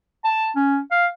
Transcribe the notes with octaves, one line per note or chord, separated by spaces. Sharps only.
A5
C#4
F5